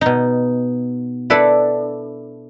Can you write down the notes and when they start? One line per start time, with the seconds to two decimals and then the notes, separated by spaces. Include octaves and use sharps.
0.01 B2 D#4
1.30 D4 E4 A4 B4 D5